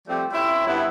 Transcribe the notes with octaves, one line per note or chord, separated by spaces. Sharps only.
F3 G3 A3 C4 G4
C4 C#4 E4 E5
G2 F#3 B3 E4